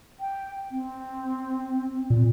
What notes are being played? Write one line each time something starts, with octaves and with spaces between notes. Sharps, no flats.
G5
C4
A#2